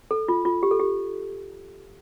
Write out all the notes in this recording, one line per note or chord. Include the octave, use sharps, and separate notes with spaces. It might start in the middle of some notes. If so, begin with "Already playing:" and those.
A4
F4
F4
G4
A4
G4